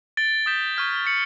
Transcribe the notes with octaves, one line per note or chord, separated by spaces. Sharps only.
A6 D7 G7
D#6 G6 B6 E7 G7
C#6 F6 G#6 B6
A6 C#7 F#7